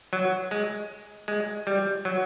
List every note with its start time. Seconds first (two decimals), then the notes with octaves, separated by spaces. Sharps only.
0.13 F#3
0.51 G#3
1.28 G#3
1.67 G3
2.05 F#3